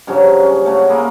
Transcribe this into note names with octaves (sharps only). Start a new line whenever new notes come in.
G2 C#3 F3 F#3
C#4
C#3 A3 F#5
A#3 E4 G#4 A#4